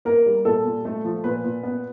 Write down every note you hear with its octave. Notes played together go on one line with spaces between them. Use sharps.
A#3 A#4
G3
A#2 A4
A#2
A3
F3
A#2 B4
A#2
B3